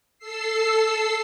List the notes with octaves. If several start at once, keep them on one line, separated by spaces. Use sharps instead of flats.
A4 E6 C7